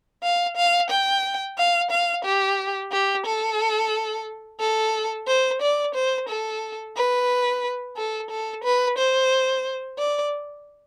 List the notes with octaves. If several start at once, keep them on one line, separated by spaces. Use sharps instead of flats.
F5
F5
G5
F5
F5
G4
G4
A4
A4
C5
D5
C5
A4
B4
A4
A4
B4
C5
D5